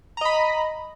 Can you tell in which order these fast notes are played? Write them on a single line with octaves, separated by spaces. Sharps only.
A#5 D#5 B5